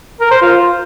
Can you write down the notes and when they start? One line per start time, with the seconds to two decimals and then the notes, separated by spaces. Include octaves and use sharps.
0.21 A#4
0.31 C5
0.42 F4